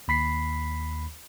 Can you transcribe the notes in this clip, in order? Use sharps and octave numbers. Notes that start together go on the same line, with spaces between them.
D#2 B5 B6 C7